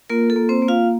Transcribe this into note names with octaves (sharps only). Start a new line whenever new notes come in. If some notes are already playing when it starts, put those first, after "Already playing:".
A#3 F4 A#4
A4
A#3
C4 C5
A#3
F4 F5